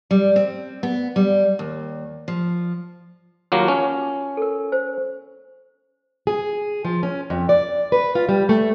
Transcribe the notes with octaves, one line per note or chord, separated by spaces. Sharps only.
G3
C4
B3
G3
D#2
F3
D#2 F#3 A#3 F4 C#6
C#4 A5
A4 A#4
C5
G#4
F3
C#4
F2
D5
B4
F4
G3
A3